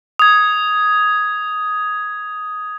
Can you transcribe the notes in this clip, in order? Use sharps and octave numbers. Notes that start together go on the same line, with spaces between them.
D#6 G#6